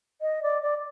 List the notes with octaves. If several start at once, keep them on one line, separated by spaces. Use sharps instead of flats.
D#5
D5
D5